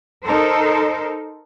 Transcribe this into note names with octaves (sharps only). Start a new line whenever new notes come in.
D#4 A4 A#4 C5